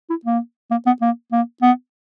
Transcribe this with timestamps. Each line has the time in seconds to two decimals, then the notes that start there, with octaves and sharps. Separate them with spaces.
0.10 E4
0.25 A#3
0.71 A#3
0.86 B3
1.01 A#3
1.32 A#3
1.62 B3